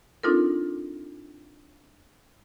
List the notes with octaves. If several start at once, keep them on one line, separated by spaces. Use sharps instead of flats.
C4 D4 D#4 F4 A4 A#4